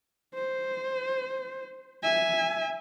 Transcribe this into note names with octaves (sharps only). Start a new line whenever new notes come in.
C5
E5 G#5